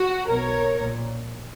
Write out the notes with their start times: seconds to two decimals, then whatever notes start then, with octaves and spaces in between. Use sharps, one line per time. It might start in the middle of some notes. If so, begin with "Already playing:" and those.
Already playing: F#4
0.27 B1 B2 A#4 C#5
0.79 A#1 A#2